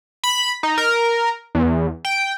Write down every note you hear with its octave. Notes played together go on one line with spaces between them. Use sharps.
B5
D#4
A#4
E2
G5